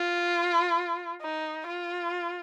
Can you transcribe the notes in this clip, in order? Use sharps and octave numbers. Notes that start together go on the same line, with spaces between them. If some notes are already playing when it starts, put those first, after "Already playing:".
Already playing: F4
D#4
F4